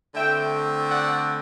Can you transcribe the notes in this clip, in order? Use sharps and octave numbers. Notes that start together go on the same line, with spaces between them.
D3 A3 C4 E5 G5
D5 F#5